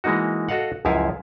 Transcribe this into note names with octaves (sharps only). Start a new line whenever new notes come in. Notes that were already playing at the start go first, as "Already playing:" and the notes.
E3 G#3 A#3 D#4 F#4
F#4 A4 D#5 F5 F#5
C#2 F#2 F3 E4 F5 G#5